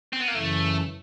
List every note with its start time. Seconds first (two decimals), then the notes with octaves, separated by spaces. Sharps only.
0.13 C4
0.20 B3
0.28 A#3
0.34 F#2 C#3 E3 A3